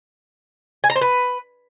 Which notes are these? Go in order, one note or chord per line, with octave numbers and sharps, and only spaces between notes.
G#5
A#5
C5
B4